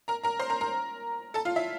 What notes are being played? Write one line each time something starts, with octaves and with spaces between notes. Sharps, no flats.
A#4 A#5
A#4 A#5
C5 C6
A#4 A#5
A#4 A#5
A4 A5
F4 F5
E4 E5